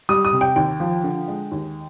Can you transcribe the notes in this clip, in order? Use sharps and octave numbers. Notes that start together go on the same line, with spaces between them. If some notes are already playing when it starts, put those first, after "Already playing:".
G3 D#6
D#6
C3
G5
D#2 G5
F3
D3
G#3
D#2